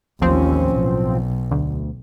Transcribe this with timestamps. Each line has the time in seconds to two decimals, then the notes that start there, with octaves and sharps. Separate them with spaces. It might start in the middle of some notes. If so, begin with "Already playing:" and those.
0.21 A1 D#2 F3 C4 C#4
0.77 B1
1.51 D2